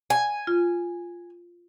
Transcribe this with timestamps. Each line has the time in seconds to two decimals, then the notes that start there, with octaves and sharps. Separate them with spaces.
0.10 G#5
0.47 F4